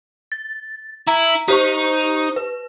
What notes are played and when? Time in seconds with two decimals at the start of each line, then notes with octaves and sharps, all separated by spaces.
0.32 A6
1.07 E4 A#5
1.48 D#4 G4 C5 C#6
2.36 B4